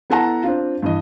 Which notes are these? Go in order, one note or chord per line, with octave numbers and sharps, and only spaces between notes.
B3 E4 A4 F#5 A5 A#5
C4 D4 F4
G2 E3 D#5